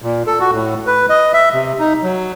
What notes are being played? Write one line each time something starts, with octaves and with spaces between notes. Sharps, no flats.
A#2
A4
F#4
A2
B4
D#5
E5
C3
D#4
F#3